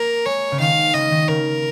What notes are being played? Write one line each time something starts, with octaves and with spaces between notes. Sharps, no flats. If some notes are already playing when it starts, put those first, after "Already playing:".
Already playing: A#3 A#4
G#3 C#5
C#3
D#3 F5
C#3 D#5
D#3
C#3 A#4